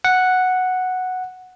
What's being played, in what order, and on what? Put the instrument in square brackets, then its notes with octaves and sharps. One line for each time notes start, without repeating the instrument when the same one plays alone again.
[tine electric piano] F#5